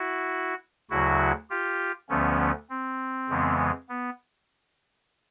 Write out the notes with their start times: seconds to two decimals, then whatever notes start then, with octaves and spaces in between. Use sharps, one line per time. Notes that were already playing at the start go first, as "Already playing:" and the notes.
Already playing: E4 F#4
0.90 D2 C#3 F#3 E4 F#4
1.50 F4 G4
2.09 D2 D3 F3 A3 B3 C#4
2.70 C4
3.29 F2 C#3 E3 G#3 B3
3.89 B3